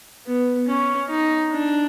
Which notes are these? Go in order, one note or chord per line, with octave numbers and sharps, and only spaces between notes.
B3
C#4
D#4
D4